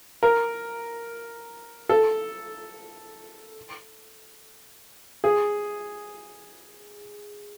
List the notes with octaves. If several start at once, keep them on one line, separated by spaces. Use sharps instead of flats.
A#4
A4
G#4